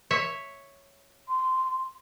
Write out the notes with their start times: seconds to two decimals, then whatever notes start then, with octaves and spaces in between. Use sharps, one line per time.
0.11 C#5 E5
1.28 C6